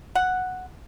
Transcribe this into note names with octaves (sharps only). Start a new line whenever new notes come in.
F#5